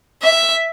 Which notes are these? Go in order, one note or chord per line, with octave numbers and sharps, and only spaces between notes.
E5